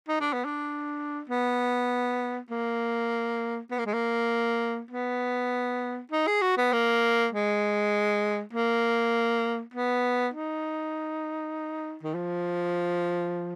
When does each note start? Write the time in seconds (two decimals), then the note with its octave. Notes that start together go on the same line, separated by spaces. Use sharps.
0.09 D#4
0.21 D4
0.33 B3
0.45 D4
1.30 B3
2.51 A#3
3.71 B3
3.78 A#3
3.86 G#3
3.94 A#3
4.91 B3
6.12 D#4
6.27 G#4
6.42 F#4
6.58 B3
6.73 A#3
7.33 G#3
8.53 A#3
9.74 B3
10.34 D#4
12.03 D#3
12.15 F3